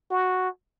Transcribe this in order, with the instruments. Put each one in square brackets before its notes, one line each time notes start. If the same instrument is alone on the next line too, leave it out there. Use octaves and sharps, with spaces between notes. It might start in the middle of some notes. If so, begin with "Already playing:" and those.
[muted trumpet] F#4